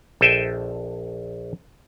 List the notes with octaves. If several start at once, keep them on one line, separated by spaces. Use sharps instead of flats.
A#1 A4 C5 D#5 E5 G5